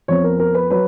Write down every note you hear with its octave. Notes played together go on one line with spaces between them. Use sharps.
F2 F3 B3 C#5
A#4
A#4
B4
F#3 B4